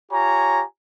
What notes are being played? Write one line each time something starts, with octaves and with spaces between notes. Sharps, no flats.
F4 G4 C#5 G#5 A#5